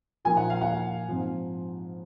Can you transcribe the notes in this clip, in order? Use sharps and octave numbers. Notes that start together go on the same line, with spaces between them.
A#2 F3 A#3 D#4 G#5
F#5
F5
F#5
G#2 F3 C4 D#4